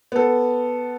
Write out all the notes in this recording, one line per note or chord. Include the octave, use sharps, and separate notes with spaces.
B3 A4